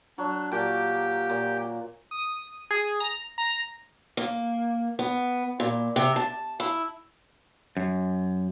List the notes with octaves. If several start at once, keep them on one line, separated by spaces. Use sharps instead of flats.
F#3 D4
A#2 G4 G5 A5 D6
A#2
D#6
G#4
A#5
A#5
A#3
B3
A#2
C3
A5
E4
F#2